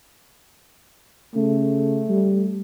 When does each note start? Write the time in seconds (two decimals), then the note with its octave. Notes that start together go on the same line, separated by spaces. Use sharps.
1.36 C#3 A3
2.09 G3